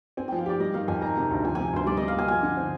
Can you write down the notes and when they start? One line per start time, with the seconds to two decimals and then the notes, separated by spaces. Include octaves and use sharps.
0.17 C4 G#5
0.28 F3 G5
0.39 F5
0.46 G4 D5
0.60 G3 D#5
0.74 D#3 F5
0.88 F2 G#5
1.02 D#3 A#5
1.17 C3
1.31 D2
1.44 F3 G#5
1.55 C3 G#5
1.73 D2 C5
1.86 G3 D5
1.97 C3 D#5
2.08 F5
2.14 A#3 G#5
2.28 F3 G#5
2.43 D3
2.57 C4